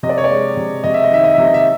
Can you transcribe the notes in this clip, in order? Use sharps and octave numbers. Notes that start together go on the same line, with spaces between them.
C3 D#5
D5
C#5
D5
G#3
C3
C3 D#5
E5
D#5
D#3 E5
D#5
C3 E5
D#5
E5